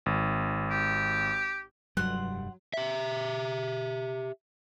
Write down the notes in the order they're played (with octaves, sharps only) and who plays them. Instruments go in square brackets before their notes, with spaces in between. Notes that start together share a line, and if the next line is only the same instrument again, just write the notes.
[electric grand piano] G#1
[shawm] G4
[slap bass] F1 G2 G3 [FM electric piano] F#3 [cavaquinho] F#5 C6
[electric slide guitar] G4 E5